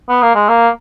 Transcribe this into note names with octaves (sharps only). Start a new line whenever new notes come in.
B3
A#3
G#3
A#3